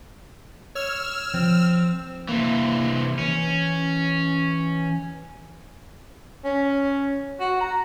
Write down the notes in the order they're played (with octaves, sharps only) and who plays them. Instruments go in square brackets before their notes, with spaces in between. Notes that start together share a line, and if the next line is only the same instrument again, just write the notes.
[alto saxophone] C#5 [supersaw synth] E6 F6
[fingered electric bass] F3 [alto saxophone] C4
[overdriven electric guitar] C3 E3 [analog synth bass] A#3
[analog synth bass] E3 [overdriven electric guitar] C#4
[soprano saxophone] C#4
F#4
A#5